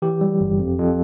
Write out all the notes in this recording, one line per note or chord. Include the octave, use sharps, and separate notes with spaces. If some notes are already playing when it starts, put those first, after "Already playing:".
E3 G4
G3
G1
F2
F2